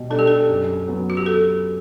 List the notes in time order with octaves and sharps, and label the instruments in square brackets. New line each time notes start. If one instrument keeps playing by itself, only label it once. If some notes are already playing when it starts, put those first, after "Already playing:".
Already playing: [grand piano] B2 G3
[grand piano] G3 D4 [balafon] A4
[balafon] G4
A4
[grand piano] F#2
F#3 B3
[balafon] F#4
G4
A4